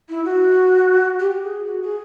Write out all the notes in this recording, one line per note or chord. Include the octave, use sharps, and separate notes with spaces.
E4
F#4
G4
G4
G#4
F#4
G#4